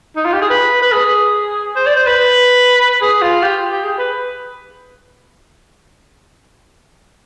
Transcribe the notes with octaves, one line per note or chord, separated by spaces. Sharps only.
D#4
F4
G4
G#4
B4
B4
G#4
C5
D5
C5
B4
G#4
F4
G4
G4
G#4
B4